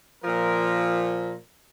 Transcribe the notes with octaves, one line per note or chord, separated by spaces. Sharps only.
A#2 F3 A#4